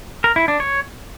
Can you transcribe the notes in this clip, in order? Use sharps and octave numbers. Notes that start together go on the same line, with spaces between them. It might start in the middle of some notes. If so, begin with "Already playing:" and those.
A#4
E4
D4
C#5